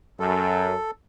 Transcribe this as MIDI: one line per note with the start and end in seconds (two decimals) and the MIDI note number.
0.20 0.76 42
0.20 0.91 69